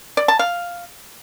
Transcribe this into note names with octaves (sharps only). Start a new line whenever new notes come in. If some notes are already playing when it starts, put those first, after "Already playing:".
D5
A5
F5